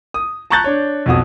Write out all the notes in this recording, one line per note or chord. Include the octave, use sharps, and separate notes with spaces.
D#6
A5 A#5 C#6 F#6 G6 A6
D4 C#5
B1 F2 F#4 D#6